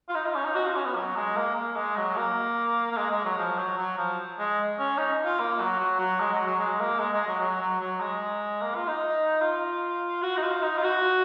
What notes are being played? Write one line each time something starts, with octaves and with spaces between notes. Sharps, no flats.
F4
D#4
F4
C#4
D#4
F#4
F4
C#4
B3
F#3
G#3
A#3
A#3
G#3
F#3
A#3
A#3
G#3
G#3
F#3
F3
F#3
F#3
F3
G#3
C#4
D#4
F4
A#3
F#3
F#3
F#3
G#3
F#3
F#3
G#3
A#3
G#3
G#3
F#3
F#3
F#3
F#3
G#3
A#3
F4
D#4
F4
F#4
D#4
F4
D#4
F4
F#4